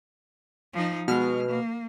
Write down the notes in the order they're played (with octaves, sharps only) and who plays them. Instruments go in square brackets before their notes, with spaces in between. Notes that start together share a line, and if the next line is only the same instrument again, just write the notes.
[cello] F3 D#4
[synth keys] B2 F6 [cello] G#3
[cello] A#3